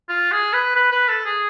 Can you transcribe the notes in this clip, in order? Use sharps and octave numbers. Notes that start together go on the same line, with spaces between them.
F4
G#4
B4
B4
B4
A4
G#4